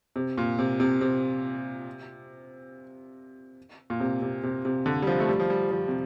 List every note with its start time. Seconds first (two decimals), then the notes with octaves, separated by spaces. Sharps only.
0.16 C3
0.38 A#2
0.59 C3
0.80 C3
1.01 C3
3.90 A#2
4.00 C3
4.22 C3
4.44 C3
4.65 C3
4.86 D3
5.02 G3
5.07 F3
5.20 A3
5.29 G3
5.40 F3
5.50 G3
5.71 F3
5.88 C3